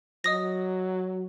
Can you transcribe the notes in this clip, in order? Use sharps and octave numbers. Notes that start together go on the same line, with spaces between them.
F#3 D#5 D#6 A#6